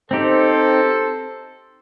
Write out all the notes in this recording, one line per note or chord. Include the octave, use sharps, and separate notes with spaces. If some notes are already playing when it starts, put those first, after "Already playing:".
C4 D#4 G4 A4 C5